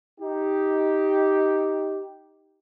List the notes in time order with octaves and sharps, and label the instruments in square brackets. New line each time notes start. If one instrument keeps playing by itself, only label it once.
[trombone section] D#4 G4